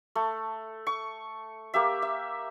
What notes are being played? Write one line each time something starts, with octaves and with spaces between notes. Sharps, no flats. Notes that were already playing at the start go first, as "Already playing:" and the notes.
A3
C#6
A#3 G4 E5
E5